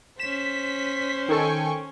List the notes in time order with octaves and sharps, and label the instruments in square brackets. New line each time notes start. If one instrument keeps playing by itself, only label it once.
[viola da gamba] C#4 C5 [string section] B6 [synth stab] E7
[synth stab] D#3 A4 [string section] G5 G#5 C#6